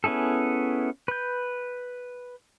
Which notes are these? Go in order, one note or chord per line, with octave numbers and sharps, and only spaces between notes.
B3 C#4 E4 G#4 A4
B4 G6